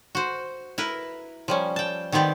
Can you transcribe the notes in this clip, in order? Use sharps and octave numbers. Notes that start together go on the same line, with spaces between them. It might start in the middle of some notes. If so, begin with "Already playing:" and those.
F#4 C5
E4 A#4 B4
F3 G3 C#4
G5 A5
D#3 B3 C4 G4 D5